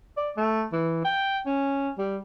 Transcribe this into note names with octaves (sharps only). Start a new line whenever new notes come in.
D5
A3
E3
G5
C#4
G3